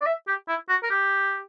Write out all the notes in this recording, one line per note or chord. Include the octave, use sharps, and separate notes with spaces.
D5
E5
G4
E4
F#4
A#4
G4